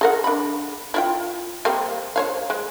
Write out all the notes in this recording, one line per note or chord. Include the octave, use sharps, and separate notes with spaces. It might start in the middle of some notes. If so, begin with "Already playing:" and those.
G#4 A#4 F#5
D4 B5
E4 F4 G5
G3 A#3 C4
C5 C#5 F5
G#3